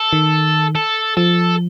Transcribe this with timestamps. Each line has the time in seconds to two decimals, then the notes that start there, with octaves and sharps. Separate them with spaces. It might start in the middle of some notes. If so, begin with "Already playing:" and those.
Already playing: A4
0.13 D#3
0.75 A4
1.17 F3 A4